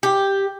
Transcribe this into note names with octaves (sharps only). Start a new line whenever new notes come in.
G4